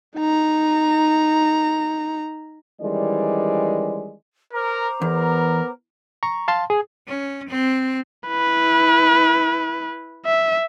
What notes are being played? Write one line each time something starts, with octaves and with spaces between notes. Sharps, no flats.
D#4 A#5
D#3 E3 G3 G#3 C#4 D5
A#4 C5 A#5 D6
E2 B3 A#4
A#5 C#6
F5 A5 C6
G#4
C#4
C4
E4 B4
E5